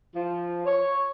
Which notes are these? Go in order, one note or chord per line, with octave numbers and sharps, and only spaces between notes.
F3
C#5